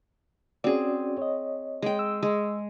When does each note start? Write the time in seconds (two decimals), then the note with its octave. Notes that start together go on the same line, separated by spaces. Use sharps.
0.64 C4 C#4 F#4 G#4 D5
1.18 C#5 D#5
1.82 G#3 G5
1.99 E6
2.23 G#3